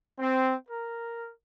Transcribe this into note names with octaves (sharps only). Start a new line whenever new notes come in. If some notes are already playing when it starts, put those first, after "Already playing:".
C4
A#4